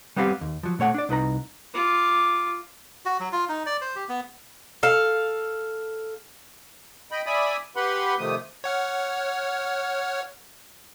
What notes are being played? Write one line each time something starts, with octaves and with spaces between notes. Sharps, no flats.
G3 B3 C4 E4 G4 F5
D#2
F3 F#3
A#2 A3 C#5 F#5
D4 D5
C2 D#4 B4 A#5
F4 D6
F#4
F#3
F4
D#4
D5
C5
G4
B3
A4 F5
D#5 G5 B5
D5 E5 G#5 B5 D#6
G4 B4 F#5 B5 C6
C3 D#3 F3 A3 D#6
C#5 F#5 F6